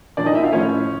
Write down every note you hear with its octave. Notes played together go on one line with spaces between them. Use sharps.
A#2 F3 D4 D5
D#4 D#5
E4 E5
F4 F5
A2 F3 C#4 C#5